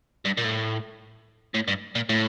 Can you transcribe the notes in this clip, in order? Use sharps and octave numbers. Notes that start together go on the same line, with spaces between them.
G2
A#2
A2
A2
G2
A#2
A2